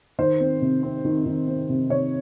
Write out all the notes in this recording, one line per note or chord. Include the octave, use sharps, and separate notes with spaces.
D#3 C5
C4
C3
C4
D#3
D#3
C4
C3
C3 C#5